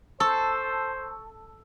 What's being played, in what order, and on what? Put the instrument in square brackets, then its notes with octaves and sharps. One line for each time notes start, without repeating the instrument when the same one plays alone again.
[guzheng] A4 [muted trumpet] C5 [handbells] C#6 E6